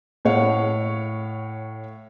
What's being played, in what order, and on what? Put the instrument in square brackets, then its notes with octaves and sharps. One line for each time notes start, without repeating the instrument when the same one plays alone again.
[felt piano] A2 A3 C#5 F5 F#5